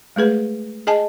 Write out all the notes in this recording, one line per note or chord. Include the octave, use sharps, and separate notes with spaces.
G#3 A3 G#4 B4
G#4 D#5 G#5 A5